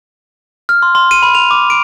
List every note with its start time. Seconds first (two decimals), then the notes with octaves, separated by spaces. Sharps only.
0.69 F6
0.82 C6
0.95 C6
1.11 D#7
1.23 B5
1.35 F7
1.51 D6
1.70 D7